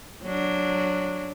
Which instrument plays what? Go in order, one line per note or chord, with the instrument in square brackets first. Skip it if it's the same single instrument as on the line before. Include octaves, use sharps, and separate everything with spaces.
[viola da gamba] F#3 D4